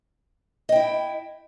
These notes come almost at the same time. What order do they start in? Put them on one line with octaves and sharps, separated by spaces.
D#5 G5 E4